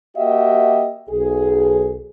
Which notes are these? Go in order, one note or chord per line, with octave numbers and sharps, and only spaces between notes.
A#3 F#4 G4 D#5 E5 G5
B1 G#4